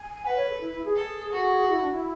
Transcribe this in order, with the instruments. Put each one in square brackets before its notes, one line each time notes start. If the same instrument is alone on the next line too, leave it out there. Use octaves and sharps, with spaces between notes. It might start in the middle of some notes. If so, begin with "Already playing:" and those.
Already playing: [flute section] G#5
[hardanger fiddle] B4 [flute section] F#5
[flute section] C#5
A4
E4
E4
G#4
[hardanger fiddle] A4
F#4
[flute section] E4
D4
E4